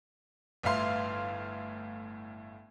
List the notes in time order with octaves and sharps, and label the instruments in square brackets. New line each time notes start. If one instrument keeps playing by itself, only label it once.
[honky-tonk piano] G1 A2 E5 F5 C6 F6